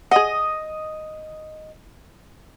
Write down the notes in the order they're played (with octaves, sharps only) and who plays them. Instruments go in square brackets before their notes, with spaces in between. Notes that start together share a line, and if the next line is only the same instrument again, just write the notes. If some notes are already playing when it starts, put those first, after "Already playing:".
[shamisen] G#4 F#5 [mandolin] D#5